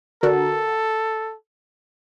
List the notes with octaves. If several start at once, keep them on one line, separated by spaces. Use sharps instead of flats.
D3 F#4 A4 A#4